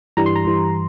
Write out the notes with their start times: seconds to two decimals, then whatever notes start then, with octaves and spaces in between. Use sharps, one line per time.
0.17 G2 E3 G3 A#5
0.26 C6
0.36 A#5
0.45 G2 E3 G3